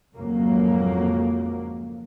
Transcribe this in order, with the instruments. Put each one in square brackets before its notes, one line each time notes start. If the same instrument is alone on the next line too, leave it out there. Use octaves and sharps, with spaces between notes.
[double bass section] G#1 F2 C#3 F#3 A#3